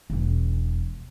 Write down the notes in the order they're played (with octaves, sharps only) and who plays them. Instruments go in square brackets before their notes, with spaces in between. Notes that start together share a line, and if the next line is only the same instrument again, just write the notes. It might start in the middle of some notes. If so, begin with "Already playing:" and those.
[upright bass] E1 E2